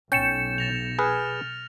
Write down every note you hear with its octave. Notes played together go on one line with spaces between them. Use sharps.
B1 C#4 G5 G6 A6 C#7 E7
A6 A#6 F7
G#4 B4 G#5 F6